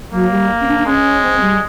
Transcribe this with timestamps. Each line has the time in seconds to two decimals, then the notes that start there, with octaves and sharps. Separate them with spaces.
0.13 F#3 A#3
0.30 G3
0.61 C#4
0.68 D4
0.79 D4
0.86 G#3 C#4
1.22 C4
1.40 G3